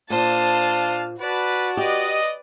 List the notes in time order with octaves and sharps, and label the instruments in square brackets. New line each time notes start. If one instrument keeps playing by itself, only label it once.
[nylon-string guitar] A#2 [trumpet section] D4 F5 [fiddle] C5 D#6 [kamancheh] A5
[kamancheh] F#4 [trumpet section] B4 [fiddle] D5 A5
[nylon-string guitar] G4 [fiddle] B4 D5 [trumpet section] D#5